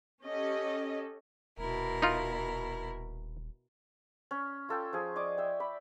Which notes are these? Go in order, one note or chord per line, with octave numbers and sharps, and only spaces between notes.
C#4 G4 A4 D#5
D#1 B2 E4 A#4
D#4 F4
C#4
F4 A4 G5
F3 G#4
D5 D#5 C#6 D6
E5 G5
D5 B5